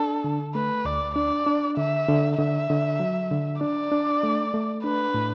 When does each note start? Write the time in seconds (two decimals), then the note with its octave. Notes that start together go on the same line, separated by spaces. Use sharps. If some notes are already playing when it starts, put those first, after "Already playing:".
Already playing: D4 A4
0.24 D3
0.55 A3 B4
0.85 D2 D5
1.16 D4 D5
1.47 D4
1.77 D3 E5
2.09 D3
2.38 D3 E5
2.70 D3
3.00 F#3
3.31 D3
3.61 D4 D5
3.91 D4
4.23 A3
4.54 A3
4.84 D4 B4
5.14 A2